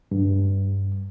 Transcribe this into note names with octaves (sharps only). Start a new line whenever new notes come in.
G2